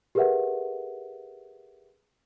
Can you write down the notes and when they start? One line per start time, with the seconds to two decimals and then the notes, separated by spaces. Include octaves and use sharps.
0.15 G4 G#4 A#4 B4 E5 F#5